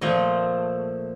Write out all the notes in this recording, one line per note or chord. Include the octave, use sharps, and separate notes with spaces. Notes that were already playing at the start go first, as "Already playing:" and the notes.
A#2 F3 A3 D#5